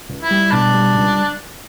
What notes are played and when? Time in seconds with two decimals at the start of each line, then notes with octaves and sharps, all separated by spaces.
0.09 C#2
0.23 E4
0.31 G3
0.52 B2 D4
0.73 G3
0.95 C#2